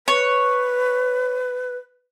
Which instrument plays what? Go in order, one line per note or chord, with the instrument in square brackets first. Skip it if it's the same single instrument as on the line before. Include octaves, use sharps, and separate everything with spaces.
[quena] B4 [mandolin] C#5